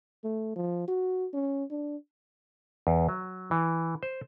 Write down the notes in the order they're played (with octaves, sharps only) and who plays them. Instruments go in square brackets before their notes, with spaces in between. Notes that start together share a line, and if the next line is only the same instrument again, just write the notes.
[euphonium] A3
F3
F#4
C#4
D4
[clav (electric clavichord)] E2
F#3
E3
C5